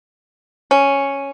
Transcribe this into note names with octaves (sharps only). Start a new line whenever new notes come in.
C#4